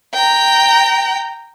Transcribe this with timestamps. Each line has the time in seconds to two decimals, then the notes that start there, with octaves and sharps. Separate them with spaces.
0.14 G5 A#5